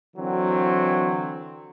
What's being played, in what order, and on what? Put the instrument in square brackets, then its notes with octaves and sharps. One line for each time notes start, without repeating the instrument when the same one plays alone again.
[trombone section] D3 E3 F#3 C4